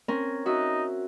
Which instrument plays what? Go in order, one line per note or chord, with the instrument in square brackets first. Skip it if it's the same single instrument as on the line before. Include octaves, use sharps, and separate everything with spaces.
[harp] C4 C#4 A#4
[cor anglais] D#4 [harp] F#4 E5